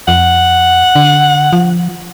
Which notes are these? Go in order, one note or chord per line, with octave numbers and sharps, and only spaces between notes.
F2 F#5
D3
F3